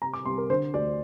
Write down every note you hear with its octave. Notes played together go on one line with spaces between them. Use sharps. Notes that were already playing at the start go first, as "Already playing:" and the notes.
C3 A#5
D6
C2 C6
A#4
D3 C5
D2 D5